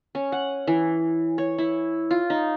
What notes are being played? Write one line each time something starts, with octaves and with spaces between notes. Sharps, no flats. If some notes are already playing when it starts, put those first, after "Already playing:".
C#4
F#5
E3
C#5
E4
F4
D#4